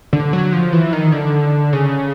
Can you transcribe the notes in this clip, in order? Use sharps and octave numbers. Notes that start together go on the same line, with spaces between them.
D3
F#3
F3
E3
D#3
D3
C#3